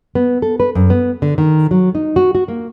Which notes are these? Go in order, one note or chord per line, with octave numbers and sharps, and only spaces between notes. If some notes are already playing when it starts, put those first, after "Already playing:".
B3
A4
B4
F#2
B3
D3
D#3
F#3
D#4
F#4
F#4
A#3